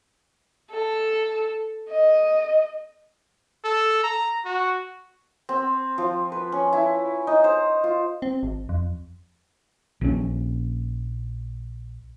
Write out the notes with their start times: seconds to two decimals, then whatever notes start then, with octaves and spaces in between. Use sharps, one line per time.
0.72 A4
1.91 D#5
3.65 A4
4.04 A#5
4.45 F#4
5.49 C4
5.98 F3
6.32 B4
6.52 C#4
6.73 E4
7.27 D#4
7.44 C5
7.84 F4
8.22 C4
8.43 G#1
8.69 F2
10.01 A#1 C#4